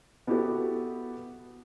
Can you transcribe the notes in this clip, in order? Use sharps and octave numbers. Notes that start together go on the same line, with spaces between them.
B3 E4 F#4 G4 A4 B4